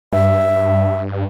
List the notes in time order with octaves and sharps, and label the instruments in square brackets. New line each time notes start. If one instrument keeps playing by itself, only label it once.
[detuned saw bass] G2 [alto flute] E5